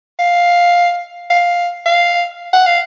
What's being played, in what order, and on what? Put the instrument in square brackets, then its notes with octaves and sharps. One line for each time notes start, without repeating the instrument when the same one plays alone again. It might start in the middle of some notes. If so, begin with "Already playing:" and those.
[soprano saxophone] F5
F5
F5
F#5
F5